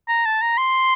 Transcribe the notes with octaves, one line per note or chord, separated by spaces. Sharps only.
A#5
A5
A#5
C6